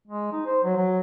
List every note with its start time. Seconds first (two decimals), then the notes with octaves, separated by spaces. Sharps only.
0.08 G#3
0.32 D#4
0.46 C5
0.64 F#3
0.76 F#3